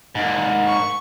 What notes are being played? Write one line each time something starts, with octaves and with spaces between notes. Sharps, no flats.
G#2 A#3
C#6